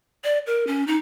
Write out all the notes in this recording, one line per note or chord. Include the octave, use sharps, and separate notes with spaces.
D5
A#4
C#4
D#4